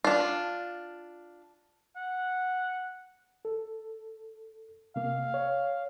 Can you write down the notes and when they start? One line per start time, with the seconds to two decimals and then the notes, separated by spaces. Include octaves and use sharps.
0.04 D4 F4
1.96 F#5
3.45 A4
4.96 C3 A#3 F5
5.34 C#5